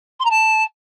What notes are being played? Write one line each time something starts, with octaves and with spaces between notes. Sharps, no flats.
C6
A#5
A5